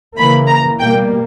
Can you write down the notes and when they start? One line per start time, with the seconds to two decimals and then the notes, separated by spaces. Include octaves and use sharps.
0.17 C#3 E3 A#3 B5
0.49 A#5
0.79 B2 G3 A#3 G5